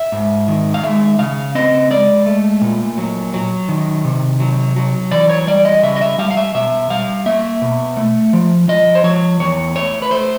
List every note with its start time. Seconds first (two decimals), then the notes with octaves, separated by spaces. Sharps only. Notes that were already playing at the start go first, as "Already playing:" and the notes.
Already playing: E5
0.12 G#2
0.48 D#3
0.74 F5
0.83 G#3 E5
1.19 C#3 F5
1.55 C4 D#5
1.90 G#3 D5
2.26 A3
2.61 A#2
2.98 F#3
3.34 F#3
3.69 D#3
4.05 C3
4.40 F#3
4.76 F#3
5.11 E3 D5
5.29 C#5
5.47 G3 D5
5.65 D#5
5.83 C#3 E5
5.96 D#5
6.01 E5
6.18 G3 F5
6.31 F5
6.37 E5
6.55 B2 E5
6.90 G3 F5
7.26 A#3 E5
7.62 B2
7.97 A3
8.33 F3
8.68 F3 D#5
8.95 C5
9.04 F3 C#5
9.40 E2 C#5
9.75 A3 C#5
10.02 B4
10.11 A3 C5